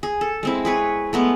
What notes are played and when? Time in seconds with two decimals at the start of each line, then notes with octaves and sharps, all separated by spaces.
0.03 G#4
0.21 A4
0.43 G#3 C4 E4
0.65 G#4 B4 C#5
1.13 G#3 A3 B3